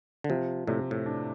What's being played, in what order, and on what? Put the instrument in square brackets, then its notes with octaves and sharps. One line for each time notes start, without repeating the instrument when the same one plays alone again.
[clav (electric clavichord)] D3
[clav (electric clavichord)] C3 [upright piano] F3
[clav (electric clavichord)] A2 [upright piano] C3
[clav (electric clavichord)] A2
[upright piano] D4